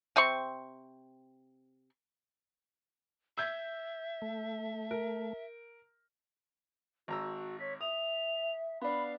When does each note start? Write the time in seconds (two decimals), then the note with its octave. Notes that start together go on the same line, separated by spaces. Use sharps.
0.16 C3 C4 C6 C#6
3.38 E5 E6 G6 G#6
4.22 A3
4.91 A#4
7.08 G#1 F#4 A#5 E6
7.60 C#5 B6
7.81 E5 D#6 F7
8.82 B3 D4 F5 B5